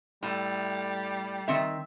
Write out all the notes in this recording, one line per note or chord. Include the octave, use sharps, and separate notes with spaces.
A2 G3
D#3 C4 E5